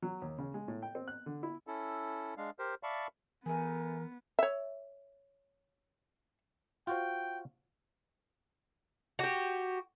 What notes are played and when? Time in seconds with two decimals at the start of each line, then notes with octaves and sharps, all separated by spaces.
0.02 F#3
0.22 D#2
0.38 C#3
0.54 G#3
0.68 A2
0.82 G5
0.95 C4
1.08 F#6
1.26 D3
1.43 E4
1.67 C#4 E4 A4
2.37 G#3 D4 F5
2.59 G4 A#4 C5
2.83 D5 E5 F5 A5 B5 C#6
3.46 E3 A3 B3 G#4 A#4
4.39 C#5 E5
6.87 F4 F#4 C5 G5
9.19 F#4 G4